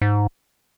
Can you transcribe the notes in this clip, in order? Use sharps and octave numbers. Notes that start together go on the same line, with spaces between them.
G#2